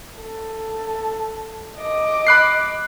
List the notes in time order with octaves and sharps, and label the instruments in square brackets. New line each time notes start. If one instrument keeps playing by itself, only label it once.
[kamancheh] A4
D#5 D6
[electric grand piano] B5 F#6 C7